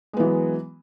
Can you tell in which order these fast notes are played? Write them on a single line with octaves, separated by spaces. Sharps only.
G#3 B3 E3 F#3